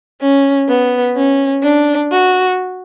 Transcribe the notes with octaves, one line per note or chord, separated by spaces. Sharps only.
C#4
B3
C#4
D4
F#4